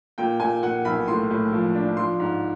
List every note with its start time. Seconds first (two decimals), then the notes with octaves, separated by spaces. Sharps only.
0.18 A#2 G5
0.40 A#2 G#5
0.63 A#2 F#5
0.85 B1 B5
1.08 A2 C6
1.31 A2
1.52 F3
1.75 D4
1.97 F3 C6
2.19 G#2